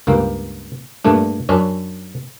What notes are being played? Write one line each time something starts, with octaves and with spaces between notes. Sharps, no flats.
C#2 G2 A#3
G2 A#2 A3 D4
F#2 C#4 D4